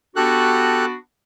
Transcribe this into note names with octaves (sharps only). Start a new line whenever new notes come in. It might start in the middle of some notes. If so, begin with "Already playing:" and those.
B3 D4 F#4 G4 A4 F#6